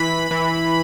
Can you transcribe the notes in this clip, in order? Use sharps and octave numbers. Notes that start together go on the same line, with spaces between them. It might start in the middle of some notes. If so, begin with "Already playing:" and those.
Already playing: E3 B5
E3